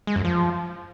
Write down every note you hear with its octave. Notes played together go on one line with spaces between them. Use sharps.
G#3
F#2
F3